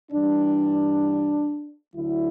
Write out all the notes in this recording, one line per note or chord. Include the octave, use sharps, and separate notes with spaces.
G2 E3 G3 D4
D2 D3 F#3 E4